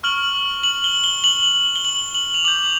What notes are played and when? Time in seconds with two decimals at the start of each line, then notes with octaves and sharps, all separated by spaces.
0.03 C#6 F6 F#7
0.64 F#7
0.84 G7
1.04 G7
1.24 F#7
1.76 G7
1.85 F#7
2.15 F#7
2.34 F7
2.44 D6 G6 F#7